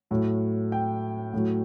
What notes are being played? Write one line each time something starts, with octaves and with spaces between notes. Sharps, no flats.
A2 F#3
G5
A2 F#3